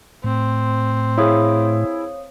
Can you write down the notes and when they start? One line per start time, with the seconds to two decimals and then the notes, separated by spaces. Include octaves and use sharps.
0.24 A2 C4
1.18 E4 G#4 C#5 F5 D#6